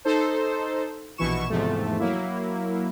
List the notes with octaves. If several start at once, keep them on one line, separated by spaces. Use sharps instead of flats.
D#4 A4 C5
A#1 B2 E3 E4 C#6 E7
E2 G#2 C3 F3 A3
F#3 A#3 E4